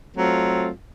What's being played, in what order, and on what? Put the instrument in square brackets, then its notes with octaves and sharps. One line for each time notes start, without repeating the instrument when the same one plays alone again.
[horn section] F#3 A3 C4 F4